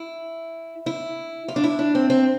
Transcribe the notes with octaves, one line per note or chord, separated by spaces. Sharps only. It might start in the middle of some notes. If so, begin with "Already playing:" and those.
Already playing: E4
E4
F4
D4
E4
D4
C4
C4